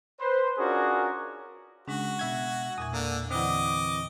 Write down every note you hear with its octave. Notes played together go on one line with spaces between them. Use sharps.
B4 C5
C#4 D4 F4 F#4 G#4 A#4
C#3 G#3 D4 F#4
B2 E5 G#6
E2 A#2 E5 G#5 D#6
D3 A#3 A#5
D3 E3 C4 D5 D#5 F#5 D6